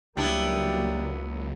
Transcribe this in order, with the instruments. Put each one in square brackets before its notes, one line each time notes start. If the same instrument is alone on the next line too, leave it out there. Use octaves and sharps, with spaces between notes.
[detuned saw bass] C#2 [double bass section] F#3 A#3 [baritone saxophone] G3 [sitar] B3 D4 E4